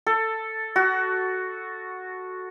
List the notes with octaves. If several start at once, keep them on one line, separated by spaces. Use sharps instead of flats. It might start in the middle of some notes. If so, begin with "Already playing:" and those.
A4
F#4